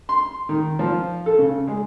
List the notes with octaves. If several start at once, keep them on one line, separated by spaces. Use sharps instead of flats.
C6
D#3
F3
A4
C#3
G#3